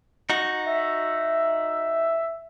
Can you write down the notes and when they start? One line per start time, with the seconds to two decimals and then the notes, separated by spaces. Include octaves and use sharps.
0.30 D#4 F#4
0.65 E5